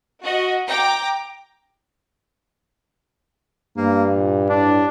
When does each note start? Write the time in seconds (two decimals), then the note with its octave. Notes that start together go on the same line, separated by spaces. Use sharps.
0.23 F#4 D#5
0.69 G5 A#5 D6
3.77 G2 A#3
4.12 A#2
4.50 A2 D4